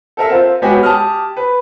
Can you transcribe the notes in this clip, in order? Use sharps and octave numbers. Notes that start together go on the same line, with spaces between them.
A4 A#4 E5
C4 F4
G#3 B3 F#4 G4 C#5 G#5
G4 A5 D#6 F6
B4